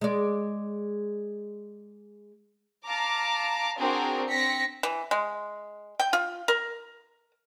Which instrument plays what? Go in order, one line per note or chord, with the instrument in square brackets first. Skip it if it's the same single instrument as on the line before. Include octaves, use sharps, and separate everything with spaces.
[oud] G#3 D5
[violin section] F5 A5 A#5 D6
C4 D4 F#4 G#4 A#4
C4 A#6 B6 C#7
[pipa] E3
G#3
G5
F4
A#4